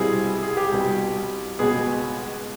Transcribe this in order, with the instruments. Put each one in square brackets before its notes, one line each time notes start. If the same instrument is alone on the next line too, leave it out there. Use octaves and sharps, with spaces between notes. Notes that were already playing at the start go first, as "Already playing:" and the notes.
Already playing: [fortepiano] C2 B2 G3 C4 E4 [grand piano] G#4
[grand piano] G#4
G4
[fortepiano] C2 B2 G3
[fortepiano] C#2 B2 G#3 B3 [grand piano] G#4